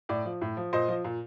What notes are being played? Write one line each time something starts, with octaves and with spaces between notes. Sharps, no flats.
A2 D5
F3
A2
F3
A#2 C5 D#5
F3
A#2